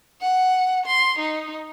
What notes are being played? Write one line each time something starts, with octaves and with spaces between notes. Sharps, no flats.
F#5
C6
D#4